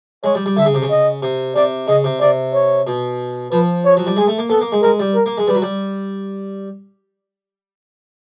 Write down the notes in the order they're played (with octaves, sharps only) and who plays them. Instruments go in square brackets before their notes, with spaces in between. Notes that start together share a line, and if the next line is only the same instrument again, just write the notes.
[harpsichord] G#3 [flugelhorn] C#5
[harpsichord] G3
G3
[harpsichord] D3 [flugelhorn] E5
[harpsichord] C#3
C3
C#3
[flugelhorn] D#5
[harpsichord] C3
[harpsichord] C3 [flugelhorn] D5
[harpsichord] C#3 [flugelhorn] D#5
[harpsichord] C3
[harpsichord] C3 [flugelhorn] D5
[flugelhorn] C#5
[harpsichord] B2
[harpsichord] F3 [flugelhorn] B4
[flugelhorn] C#5
[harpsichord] F#3
G3
[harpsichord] G#3 [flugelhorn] G#4
[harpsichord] A3
A#3
[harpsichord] B3 [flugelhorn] A4
[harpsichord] A#3
G#3
[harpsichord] G#3 [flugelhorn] A#4
[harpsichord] G3
[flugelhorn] A#4
[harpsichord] A#3
G#3
[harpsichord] G3 [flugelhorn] B4
[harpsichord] F#3
G3